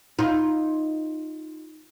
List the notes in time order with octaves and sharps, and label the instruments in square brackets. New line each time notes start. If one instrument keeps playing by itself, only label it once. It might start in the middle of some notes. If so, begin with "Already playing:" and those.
[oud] D#4 F4